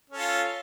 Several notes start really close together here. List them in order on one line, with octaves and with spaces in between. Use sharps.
C#4 A4 F4